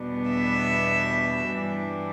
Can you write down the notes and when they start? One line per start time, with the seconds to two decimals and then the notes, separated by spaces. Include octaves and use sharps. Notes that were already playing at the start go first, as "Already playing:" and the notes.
Already playing: E2 B2 G3 B3 D4
0.29 E5
1.54 G2 E3 G3 D4